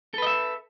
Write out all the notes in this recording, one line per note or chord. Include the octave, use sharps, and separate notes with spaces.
A4 B4 D#5 E5